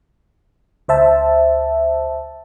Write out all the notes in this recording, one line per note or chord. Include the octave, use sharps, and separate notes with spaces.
C#2 C5 E5 A5